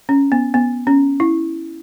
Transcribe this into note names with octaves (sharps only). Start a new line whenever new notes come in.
C#4
B3
B3
C#4
E4